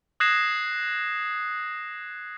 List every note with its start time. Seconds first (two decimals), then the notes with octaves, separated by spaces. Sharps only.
0.20 D#6 F#6 G#6 A#6 C7 E7